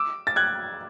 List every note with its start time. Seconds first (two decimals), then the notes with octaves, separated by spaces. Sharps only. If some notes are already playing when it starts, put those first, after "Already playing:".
Already playing: D6 E6
0.27 A6
0.36 F#6 G#6